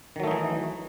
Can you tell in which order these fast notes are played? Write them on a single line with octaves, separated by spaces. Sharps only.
D#3 F#3 A3 D#4 E3